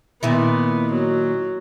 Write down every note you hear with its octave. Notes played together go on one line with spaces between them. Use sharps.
A#2 D#3 B3 E4
F#3